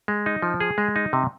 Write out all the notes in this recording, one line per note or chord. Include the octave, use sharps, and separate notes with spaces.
G#3
D#4
F3
G#4
G#3
D#4
C3